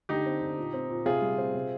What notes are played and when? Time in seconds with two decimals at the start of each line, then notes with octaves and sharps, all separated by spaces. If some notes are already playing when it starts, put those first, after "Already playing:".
0.09 D3 D#4 G4
0.26 C4
0.41 D3
0.58 A#2
0.74 C4
0.90 A#2
1.06 C3 F4 G#4
1.22 G3
1.38 C4
1.54 C3